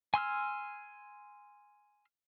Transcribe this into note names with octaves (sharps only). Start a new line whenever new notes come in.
G#5 C6 E6 F6